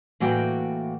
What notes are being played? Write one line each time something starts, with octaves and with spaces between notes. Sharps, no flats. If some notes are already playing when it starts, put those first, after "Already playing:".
A2 E3 A#3 F#4 F#5 G5